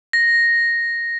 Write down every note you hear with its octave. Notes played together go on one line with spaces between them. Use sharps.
A#6